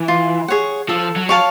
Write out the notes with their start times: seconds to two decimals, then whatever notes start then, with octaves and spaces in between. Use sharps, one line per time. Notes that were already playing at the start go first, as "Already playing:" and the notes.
Already playing: E3
0.08 F4
0.48 G#4 C#5 F#5
0.89 F3 A4
1.16 F#3
1.29 C#5 F5 A5